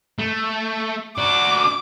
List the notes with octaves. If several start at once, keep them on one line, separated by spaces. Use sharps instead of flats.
A3
D4 F#4 D6